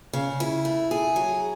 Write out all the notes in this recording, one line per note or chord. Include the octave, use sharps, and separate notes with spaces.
C#3
E4
A3
G#4
F#3